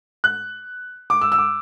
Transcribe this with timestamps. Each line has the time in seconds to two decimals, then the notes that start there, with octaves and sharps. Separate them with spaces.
0.24 F#6
1.10 D6
1.21 E6
1.32 E6
1.38 D6